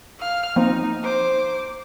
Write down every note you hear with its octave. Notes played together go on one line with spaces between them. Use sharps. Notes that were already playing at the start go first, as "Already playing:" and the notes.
F5 F6
F3 A#3 C4 D#4
C5 D6